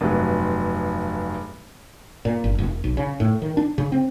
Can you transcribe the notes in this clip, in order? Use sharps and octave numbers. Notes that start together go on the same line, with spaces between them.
F1 G2 F#3 G#3 B3
A#2
G1
E1
B1
C#3
A2
D#3
D4
C#3
C4